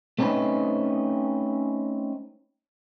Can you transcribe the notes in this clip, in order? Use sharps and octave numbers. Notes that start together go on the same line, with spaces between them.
A3 C4 C#4 D#4 B4